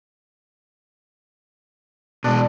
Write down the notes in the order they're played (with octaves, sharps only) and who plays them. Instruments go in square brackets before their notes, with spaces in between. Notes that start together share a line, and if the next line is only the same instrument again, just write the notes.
[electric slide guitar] B2 G#3 [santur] D4